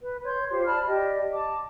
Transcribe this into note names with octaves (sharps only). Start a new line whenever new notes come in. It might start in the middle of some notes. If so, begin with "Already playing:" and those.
B4
C#5 C6 G6
F4 G4 C5
D5 A5 B5 F6
G4 D5 D#5
A5 D6